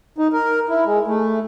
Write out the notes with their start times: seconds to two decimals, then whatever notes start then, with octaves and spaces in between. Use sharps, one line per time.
0.18 D#4
0.33 A#4
0.69 E4
0.85 G#3
1.07 A3